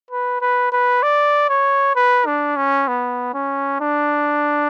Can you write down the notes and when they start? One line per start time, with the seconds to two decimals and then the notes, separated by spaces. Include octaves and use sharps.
0.11 B4
0.41 B4
0.72 B4
1.03 D5
1.49 C#5
1.96 B4
2.26 D4
2.56 C#4
2.88 B3
3.34 C#4
3.81 D4